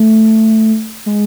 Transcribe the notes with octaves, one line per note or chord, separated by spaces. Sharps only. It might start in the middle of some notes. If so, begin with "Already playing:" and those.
Already playing: A3
G#3